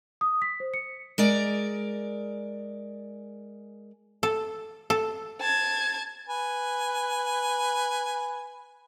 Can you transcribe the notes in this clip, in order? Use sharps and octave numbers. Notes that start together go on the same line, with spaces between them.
D#6
B6
C5
C#7
G#3 A#4 D5
A4
A4
A5 G#6
B4 G#5